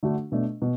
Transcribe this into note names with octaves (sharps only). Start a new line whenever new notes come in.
D3 A3 D4 F#4
B2 A3 D4
B2